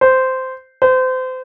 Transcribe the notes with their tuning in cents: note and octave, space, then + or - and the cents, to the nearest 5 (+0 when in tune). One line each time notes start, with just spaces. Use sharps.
C5 -10
C5 -30